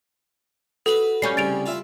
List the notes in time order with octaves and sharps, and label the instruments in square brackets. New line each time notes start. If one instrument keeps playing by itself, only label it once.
[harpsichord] F#4 B4 [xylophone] A4 F#7
[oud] G3 C#4 [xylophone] G6 C7
[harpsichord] C2 C#3 [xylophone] A6 D7 F7
[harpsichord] E4 F4